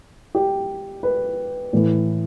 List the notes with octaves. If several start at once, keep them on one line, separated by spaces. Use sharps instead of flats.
G4
B4
A2 E3